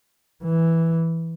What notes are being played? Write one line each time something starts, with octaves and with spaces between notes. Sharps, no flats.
E3